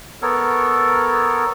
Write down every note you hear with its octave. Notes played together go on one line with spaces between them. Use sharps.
B3 A4 A#4 C#5